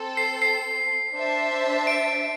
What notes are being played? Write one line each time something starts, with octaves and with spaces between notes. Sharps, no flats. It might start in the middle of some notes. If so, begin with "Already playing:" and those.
Already playing: C4 A4 C5
C7
C7
D4 C5 E5 A5
D7